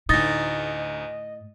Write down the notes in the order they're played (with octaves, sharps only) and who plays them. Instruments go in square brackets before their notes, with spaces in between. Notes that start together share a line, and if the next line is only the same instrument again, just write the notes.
[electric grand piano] D2 D#4 [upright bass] A2 [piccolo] D#5 [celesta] D#6 A6 A#6